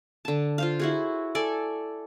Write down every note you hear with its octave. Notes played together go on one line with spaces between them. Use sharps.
D3 A5
F4 C5 F5
E4 F#4 G#4
A4 D5 G#5